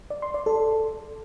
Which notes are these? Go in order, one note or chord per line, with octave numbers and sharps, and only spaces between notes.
D5
C6
D5
A4